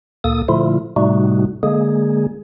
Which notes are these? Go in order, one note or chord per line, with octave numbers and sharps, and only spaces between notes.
D2 A#2 A#3 A4 D#6
A#2 D3 F3 A3 E4 F4
A2 C3 G3 A3 D#4 F#4
D3 G#3 A#3 G#4